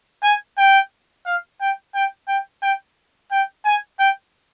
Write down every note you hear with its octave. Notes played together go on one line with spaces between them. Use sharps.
G#5
G5
F5
G5
G5
G5
G5
G5
G#5
G5